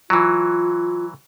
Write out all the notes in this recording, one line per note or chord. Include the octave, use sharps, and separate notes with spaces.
E3 F#3 F4